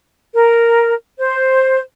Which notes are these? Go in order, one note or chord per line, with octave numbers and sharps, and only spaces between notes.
A#4
C5